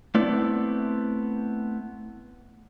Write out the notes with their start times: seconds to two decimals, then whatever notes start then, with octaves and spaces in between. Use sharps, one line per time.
0.15 A3 B3 C4 E4 D5